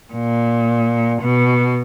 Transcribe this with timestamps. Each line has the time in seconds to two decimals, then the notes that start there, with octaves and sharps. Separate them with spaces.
0.13 A#2
1.22 B2